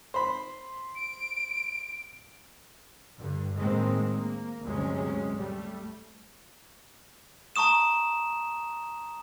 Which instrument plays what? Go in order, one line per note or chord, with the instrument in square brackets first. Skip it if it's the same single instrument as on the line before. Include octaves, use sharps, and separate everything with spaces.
[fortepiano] C5 B5
[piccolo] D7
[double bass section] G2 D3
A2 D#3 G#3 A#3 C4
A#3
D2 G2 C3 F#3 G#3 C#4
G3 A3
[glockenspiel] A5 A#5 C#6 D#6 E7